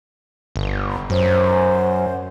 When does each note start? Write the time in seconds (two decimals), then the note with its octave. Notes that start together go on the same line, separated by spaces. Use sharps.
0.56 G1
1.10 F#2 C5